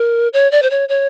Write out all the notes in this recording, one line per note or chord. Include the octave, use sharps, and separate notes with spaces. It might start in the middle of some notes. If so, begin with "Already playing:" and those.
Already playing: A#4
C#5
D5
C5
C#5
C#5